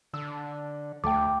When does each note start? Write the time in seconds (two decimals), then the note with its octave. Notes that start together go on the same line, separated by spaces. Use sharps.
0.13 D3 E6
1.04 D2 A3 G5 D6